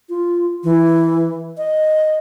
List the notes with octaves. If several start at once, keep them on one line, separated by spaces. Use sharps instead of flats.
F4
E3
D#5